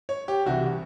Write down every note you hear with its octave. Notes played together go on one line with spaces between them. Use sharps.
C#5
G4
C2 C3 E3 F#4